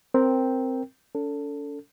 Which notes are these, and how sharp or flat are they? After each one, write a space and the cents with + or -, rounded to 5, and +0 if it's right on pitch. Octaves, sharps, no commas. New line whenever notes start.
C4 +0 A#4 +0 G5 +0
C#4 +45 A4 +15